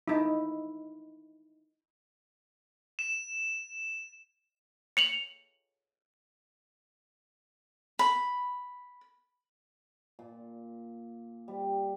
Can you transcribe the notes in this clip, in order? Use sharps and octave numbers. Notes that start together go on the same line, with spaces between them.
D#4 E4
E7
C#7 F7 F#7
B5
A#2
G3